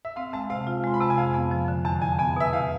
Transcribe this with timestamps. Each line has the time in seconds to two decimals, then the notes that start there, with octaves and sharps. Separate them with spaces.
0.05 E5
0.16 C4 F5
0.33 G#3 A5
0.50 C3 F5
0.67 F4
0.84 G#3 C6
0.94 B5
1.00 C3 A5
1.10 G#5
1.18 F2 F5
1.34 B3
1.51 F3
1.68 D3
1.85 E2 A5
2.01 E2 G#5
2.19 B3 G#5
2.36 B2 E5
2.53 E2 F5